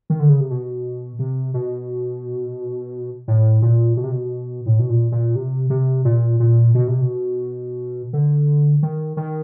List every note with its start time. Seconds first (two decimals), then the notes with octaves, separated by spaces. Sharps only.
0.10 D#3
0.20 D3
0.29 C#3
0.40 C3
0.50 B2
1.19 C3
1.54 B2
3.28 A2
3.62 A#2
3.97 B2
4.04 C3
4.11 B2
4.66 A2
4.79 B2
4.89 A#2
5.12 A#2
5.35 C3
5.70 C3
6.05 A#2
6.40 A#2
6.75 B2
6.88 C3
7.01 B2
8.13 D3
8.83 D#3
9.17 D#3